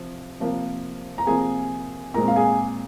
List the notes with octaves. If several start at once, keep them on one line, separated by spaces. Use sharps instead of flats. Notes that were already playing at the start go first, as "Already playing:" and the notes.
Already playing: C3 F3
C3 F3 A#3
A#5
C3 F3 A#3 G#4 G#5
A#2 G#3 C4 A#4 A#5
F5
G#4 G#5